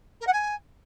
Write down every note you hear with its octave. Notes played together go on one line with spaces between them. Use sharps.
A#4
F#5
G#5